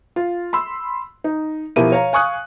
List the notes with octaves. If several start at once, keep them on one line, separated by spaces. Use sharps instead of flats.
F4
B5 C6 E6
D#4
B2 F3 E4 G4 A#4 D#7
C#5 F5 A#5
F5 G#5 C#6 D#6 F#6